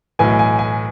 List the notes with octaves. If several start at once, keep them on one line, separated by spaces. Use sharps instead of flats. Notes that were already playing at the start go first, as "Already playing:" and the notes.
B1 A2 E3 G#5
G#5
G#5